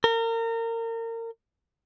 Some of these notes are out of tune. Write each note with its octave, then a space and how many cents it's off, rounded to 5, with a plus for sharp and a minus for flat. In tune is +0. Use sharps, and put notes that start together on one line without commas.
A#4 -30